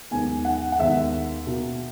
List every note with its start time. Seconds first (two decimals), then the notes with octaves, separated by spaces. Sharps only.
0.11 D#2 D#3 G#3 B3 G#5
0.45 F#5
0.72 F#5
0.79 D#2 D#3 G#3 B3 E5
1.46 B2 A#3